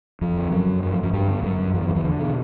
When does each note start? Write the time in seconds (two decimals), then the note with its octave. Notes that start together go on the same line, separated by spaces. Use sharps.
0.21 F2 F3
0.37 D3
0.52 F#2 F#3
0.82 G2 F#3
0.93 F3
1.03 F#2 F#3
1.13 G2 G3
1.28 D3
1.43 F#2 F#3
1.74 E2 F3
1.81 E3
1.89 D#3
1.95 E2 E3
2.04 D3
2.19 B2